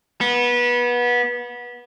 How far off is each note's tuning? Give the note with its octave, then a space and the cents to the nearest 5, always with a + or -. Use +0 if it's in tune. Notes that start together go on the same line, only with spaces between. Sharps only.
B3 -25